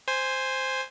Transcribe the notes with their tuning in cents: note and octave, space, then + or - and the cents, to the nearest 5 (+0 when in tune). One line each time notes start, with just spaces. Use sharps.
C5 +0 G#5 -10